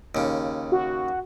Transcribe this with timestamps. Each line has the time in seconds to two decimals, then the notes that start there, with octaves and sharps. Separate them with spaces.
0.15 D#2 C#3
0.72 F#4